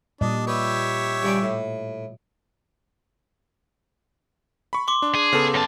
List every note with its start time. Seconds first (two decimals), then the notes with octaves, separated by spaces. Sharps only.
0.21 A#2 G3 D4 D#5
0.47 G4 B4 C#5 E5
1.23 G2 C#3 D5
1.42 A2
4.73 B5 C#6
4.88 C6 D6
5.02 D4
5.14 G#4
5.33 C#3 B3 A4
5.54 F#2 A5